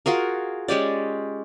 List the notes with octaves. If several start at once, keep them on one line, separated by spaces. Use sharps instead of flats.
F4 F#4 G#4 A#4
G#3 C#4 G4 D5